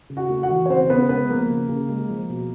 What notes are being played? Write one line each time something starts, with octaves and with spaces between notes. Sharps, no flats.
C#3
F#4 F#5
A3
F#4 F#5
E3
C#5
C#3 C4 C5
C#3 B3 B4
G#3 B3 B4
F3 A#3 A#4
C#3
C#3
G#3
F3
B2